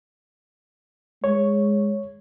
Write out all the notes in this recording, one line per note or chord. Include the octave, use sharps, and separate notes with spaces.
G#3 C#5